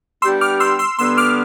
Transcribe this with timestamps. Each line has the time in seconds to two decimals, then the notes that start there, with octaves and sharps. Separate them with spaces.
0.22 G3 B3 D4 G4 C6 E6
0.41 D6 F6
0.60 C6 E6
0.79 C6 E6
0.99 D3 G3 B3 C6 E6
1.17 D6 F6